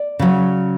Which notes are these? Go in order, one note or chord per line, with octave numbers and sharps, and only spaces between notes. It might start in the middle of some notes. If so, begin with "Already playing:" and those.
Already playing: D5
C#3 F#3